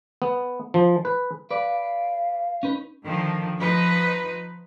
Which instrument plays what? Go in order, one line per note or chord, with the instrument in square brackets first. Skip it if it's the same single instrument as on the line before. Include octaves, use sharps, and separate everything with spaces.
[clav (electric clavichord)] B3
F3
B4
[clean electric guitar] B4 D5 [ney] F5
[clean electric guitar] C#4 D#4 B4
[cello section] D3 D#3 F3
F3 D#4 B4